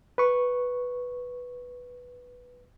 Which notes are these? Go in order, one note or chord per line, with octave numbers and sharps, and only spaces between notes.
B4 C#6